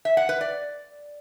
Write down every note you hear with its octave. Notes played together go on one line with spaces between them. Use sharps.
E5
F#5
B4
D5